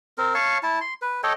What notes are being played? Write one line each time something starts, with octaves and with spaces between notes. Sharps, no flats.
C4 A#4
C#5 F5 A5 C#6
E4 A5
C6
B4
A4 C#5 D#5 G5